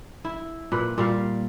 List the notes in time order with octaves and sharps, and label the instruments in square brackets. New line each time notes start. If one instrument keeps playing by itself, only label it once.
[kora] E4
A#2 B4
A#2 G3 F5